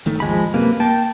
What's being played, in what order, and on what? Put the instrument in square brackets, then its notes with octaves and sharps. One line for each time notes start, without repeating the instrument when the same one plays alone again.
[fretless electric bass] G1 D#3 A3
[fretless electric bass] G#1 D#2 [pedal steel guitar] F3 G#3 B5
[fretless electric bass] F#2 C3 [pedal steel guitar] A#3 B4
[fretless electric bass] A#3 [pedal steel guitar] G5 A5